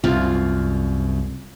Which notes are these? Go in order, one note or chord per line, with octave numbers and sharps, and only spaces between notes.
C2 F#2 F4